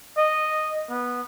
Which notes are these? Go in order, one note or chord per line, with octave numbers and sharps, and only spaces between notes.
D#5
B3